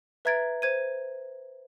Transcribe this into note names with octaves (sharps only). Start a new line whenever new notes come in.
B4 E5 A#5 G#6 A6 D7
C5 G#6 D#7